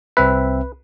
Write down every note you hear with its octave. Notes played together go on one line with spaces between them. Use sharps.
C2 C4 B4 E5